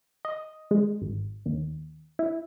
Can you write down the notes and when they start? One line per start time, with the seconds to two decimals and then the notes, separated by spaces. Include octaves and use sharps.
0.25 D#5
0.71 G#3
1.02 G#1
1.46 D#2
2.19 E4